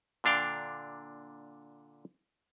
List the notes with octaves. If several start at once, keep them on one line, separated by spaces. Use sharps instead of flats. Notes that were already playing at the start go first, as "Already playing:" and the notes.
A#2 D3 D4 F5 G5